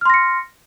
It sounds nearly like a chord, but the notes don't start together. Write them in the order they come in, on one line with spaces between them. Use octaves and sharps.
F6 C6 A#6 C#7